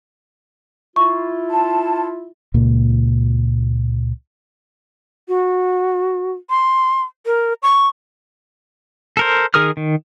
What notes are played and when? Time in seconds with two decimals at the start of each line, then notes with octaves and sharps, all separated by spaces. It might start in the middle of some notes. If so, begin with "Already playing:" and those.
0.96 E4 F4 C#6
1.50 A5
2.54 C#2 A#2 A#3
5.28 F#4
6.50 C6
7.26 A#4
7.63 C#6
9.17 A4 A#4 C5
9.54 D#3 G#4 A#4 D#6 F6
9.77 D#3